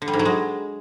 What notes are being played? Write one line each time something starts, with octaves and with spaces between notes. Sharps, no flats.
D3
G3
G#2
F#3
G#3